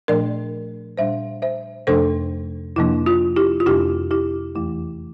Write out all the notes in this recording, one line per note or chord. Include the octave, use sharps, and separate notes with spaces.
A#2 F3 A3 D4 A#4 D5
A#2 G3 D4 C5 E5
C5 E5
F2 C3 F3 A3 D4 A4 C5
F2 C3 F3 A#3 D4 E4
F4
E4 G4
F4
F2 C3 G3 A#3 D4 E4 G4
E4 G4
E2 E3 A3 E4